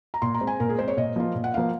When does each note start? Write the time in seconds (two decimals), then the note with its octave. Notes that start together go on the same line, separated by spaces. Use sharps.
0.14 A#5
0.22 A#2 C6
0.34 A#5
0.41 G#3 C4
0.47 G#5
0.60 A#2 A#4
0.69 G#4
0.79 G#3 C4 C5
0.88 C#5
0.97 A#2 D#5
1.16 F3 A#3 F4
1.35 A#2
1.44 F#5
1.54 F3 A#3 F4 F5